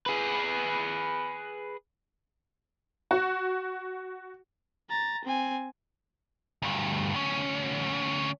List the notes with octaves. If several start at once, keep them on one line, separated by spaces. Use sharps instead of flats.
G#4 B4
F#4
A#5 A6
C4 G#5
D2 G2
D2 C#4